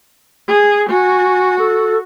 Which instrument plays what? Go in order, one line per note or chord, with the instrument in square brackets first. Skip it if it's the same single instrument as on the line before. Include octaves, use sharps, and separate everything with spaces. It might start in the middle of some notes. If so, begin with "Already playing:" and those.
[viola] G#4
[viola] F#4 [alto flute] G#5
[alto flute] A4